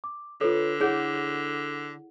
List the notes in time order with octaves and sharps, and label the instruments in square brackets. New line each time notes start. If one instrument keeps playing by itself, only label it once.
[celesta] D6
[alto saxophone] D3 [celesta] F4 B4 C#5 [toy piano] A4
[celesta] E4 F#5 [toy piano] G#4 C#5